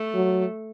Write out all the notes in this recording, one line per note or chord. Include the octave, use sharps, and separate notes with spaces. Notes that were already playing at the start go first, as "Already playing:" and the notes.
Already playing: A3
F#3